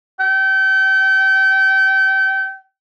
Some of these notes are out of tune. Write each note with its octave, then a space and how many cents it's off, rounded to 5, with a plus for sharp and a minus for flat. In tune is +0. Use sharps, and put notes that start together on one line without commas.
G5 -30